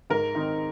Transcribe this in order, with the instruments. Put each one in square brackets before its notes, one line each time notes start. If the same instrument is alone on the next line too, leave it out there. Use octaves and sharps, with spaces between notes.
[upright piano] G#2 A#4
D#3 C4 D#4